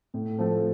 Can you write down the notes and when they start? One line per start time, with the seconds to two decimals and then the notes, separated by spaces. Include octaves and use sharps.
0.14 A2
0.39 F3 A3